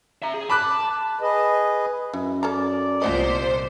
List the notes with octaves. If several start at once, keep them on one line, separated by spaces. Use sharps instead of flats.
E5 A#5
G#4
A5 B5 D6 F#6
G#4 B4 D#5
F#2 E3
C#4 A4 D5 A#5
C2 A#2 F3 B3 C5 D#5